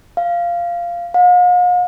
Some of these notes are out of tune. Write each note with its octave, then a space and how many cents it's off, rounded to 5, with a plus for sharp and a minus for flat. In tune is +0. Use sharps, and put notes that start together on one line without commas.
F5 -10
F5 +45